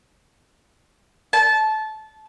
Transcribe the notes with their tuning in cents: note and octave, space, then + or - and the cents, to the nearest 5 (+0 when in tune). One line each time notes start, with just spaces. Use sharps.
A5 -20